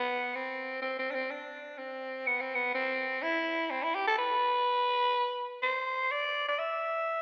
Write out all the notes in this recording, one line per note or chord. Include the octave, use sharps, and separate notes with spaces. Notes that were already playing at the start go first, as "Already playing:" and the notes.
Already playing: B3
C4
C4
C4
D4
C4
D4
C4
B3
C4
B3
C4
E4
C4
E4
G4
A4
B4
C5
D5
D5
E5